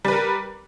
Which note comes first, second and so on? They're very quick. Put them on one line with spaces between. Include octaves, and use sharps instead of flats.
G3 B4 A#4